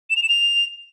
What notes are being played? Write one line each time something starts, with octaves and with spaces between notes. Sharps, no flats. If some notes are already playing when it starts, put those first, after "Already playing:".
E7
F7
E7
F7